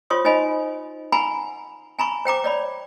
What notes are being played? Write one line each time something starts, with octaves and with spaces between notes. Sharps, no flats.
F4 C5 C#5 C6 D#6
D#4 C5 D#5 G#5 B5
F#5 G#5 A#5 B5 C#6
G#5 A#5 B5 C#6
C5 G5 A#5 D6
C#5 D5 B5